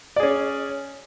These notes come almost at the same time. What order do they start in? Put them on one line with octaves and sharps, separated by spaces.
D5 G#4 C#4